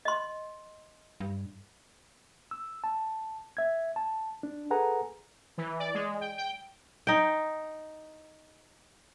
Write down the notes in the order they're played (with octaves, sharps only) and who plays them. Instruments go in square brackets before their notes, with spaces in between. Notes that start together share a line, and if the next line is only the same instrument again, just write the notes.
[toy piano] D#5 C6
[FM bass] G2
[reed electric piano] E6
A5
E5 G#6
A5
D4
G#4 A4 B4 F#5 G#5 A#5
[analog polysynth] E3
D5
G#3
G5
G5
[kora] D#4 G5